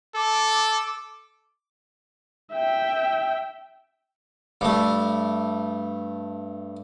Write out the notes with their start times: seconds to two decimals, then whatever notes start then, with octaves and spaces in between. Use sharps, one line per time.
0.16 A4 D6
2.53 E5 G5
4.61 G2 A3